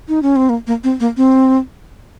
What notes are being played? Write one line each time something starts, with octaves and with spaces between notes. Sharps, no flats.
D#4
C#4
C4
A#3
A#3
C4
A#3
C4